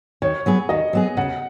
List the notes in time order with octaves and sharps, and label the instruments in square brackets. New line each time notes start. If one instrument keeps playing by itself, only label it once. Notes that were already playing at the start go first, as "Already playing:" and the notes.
[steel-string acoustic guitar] D#3 [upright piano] C#5
[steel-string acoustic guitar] F#3 B3 G#4
[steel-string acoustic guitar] D#3 [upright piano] D#5
[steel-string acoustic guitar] F#3 B3 G#4
[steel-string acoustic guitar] C#3 [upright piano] F#5